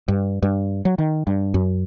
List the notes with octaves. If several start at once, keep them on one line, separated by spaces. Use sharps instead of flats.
G2
G2
F#3
D#3
G2
F#2